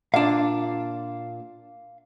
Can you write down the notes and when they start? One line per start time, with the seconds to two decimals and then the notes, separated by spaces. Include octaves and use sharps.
0.14 A#2 D4 F5